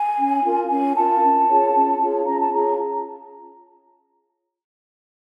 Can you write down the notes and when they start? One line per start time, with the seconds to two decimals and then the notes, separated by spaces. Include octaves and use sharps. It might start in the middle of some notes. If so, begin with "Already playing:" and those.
Already playing: G#5
0.17 C#4
0.43 F4 A#4
0.70 C#4 G#5
0.96 F4 A#4 A5
1.22 C#4
1.48 F4 G#4 C#5
1.73 C#4
1.99 F4 G#4 C#5
2.26 C#4 A#5
2.40 A5
2.52 F4 G#4 C#5 A#5